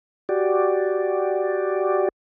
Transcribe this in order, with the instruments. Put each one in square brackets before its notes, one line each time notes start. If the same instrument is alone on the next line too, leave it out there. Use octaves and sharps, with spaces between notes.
[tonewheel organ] F#4 G4 D5